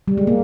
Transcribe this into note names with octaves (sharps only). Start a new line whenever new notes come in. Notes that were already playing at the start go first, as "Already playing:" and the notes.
G3
G#3
A#3